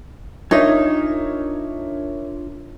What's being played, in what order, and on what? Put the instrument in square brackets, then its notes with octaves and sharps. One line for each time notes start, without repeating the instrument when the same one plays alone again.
[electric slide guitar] D4 F4 G#5 [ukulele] D#4 [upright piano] A#4 C#5 E5